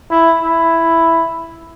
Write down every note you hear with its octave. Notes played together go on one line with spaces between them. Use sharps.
E4
E4